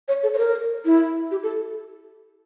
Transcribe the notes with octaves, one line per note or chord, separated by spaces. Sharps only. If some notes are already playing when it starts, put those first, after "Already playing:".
C#5
A4
C#5
A#4
E4
G4
A4